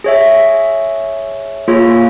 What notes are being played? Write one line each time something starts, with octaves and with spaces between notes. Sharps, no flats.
G#4 C#5 E5
A#3 F4 G#4 C#5